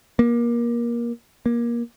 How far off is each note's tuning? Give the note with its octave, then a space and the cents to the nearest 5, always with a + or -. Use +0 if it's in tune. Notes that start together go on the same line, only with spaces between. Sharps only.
A#3 +25
A#3 +25